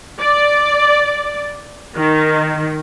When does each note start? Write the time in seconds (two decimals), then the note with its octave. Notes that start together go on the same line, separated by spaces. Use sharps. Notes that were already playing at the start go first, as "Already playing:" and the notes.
0.20 D5
1.96 D#3